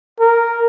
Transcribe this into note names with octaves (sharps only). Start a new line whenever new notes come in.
A#4